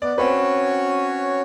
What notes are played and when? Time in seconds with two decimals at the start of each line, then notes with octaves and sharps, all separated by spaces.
0.02 B3 D5
0.18 C4 C#4 F#4 B4 C#5